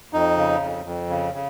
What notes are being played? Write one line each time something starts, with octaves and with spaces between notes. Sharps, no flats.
F2 D#4
C#3
F2
F2
C#3
C#3